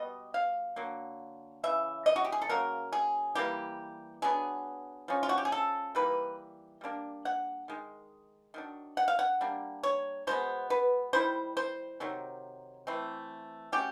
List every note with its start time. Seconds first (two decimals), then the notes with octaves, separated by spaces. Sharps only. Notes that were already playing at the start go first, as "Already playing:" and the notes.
Already playing: B2 G3 B3 D#5
0.34 F5
0.76 D3 F#3 A#3
1.63 C#3 E3 E5
2.06 D#5
2.16 F#4
2.25 G4
2.32 G#4
2.42 A4
2.49 C#3 F#3 A#3 A#4
2.92 G#4
3.35 E3 G3 A#3 G4
4.22 F#3 B3 D4 G#4
5.08 F3 G#3 C#4
5.23 F4
5.29 F#4
5.38 G4
5.45 G#4
5.52 A4
5.95 E3 G3 A#3 D#4 B4
6.81 G3 A#3 D4
7.25 F#5
7.68 D#3 G#3
8.54 D#3 F#3 D4
8.97 F#5
9.08 F5
9.19 F#5
9.41 G3 A#3 D4
9.83 C#5
10.27 B2 G#3 B3 C5
10.70 B4
11.13 D#3 G3 B3 E4 C5
11.57 C5
12.00 C3 D#3 F#3
12.87 E3 A3 C4
13.72 F#3 A3 C#4 G4